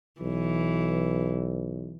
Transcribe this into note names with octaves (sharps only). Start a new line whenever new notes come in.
B1 E3